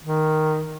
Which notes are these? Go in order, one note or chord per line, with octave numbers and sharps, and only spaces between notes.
D#3